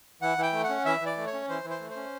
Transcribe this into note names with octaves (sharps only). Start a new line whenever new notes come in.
E3 F#5
E3 G5
A3
F#5
C#4
E3 E5
E3
D5
A3
C#5
C#4
E3 C5
E3
C5
A3
C5
C#4